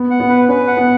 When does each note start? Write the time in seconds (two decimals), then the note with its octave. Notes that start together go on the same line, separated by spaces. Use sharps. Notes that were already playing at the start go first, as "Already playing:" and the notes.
Already playing: B3
0.11 F#5
0.20 B3
0.29 B4
0.49 C#4 B4
0.67 F#5
0.77 B3